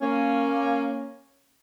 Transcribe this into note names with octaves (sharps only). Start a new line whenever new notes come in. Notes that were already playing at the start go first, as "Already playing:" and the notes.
A#3 C#4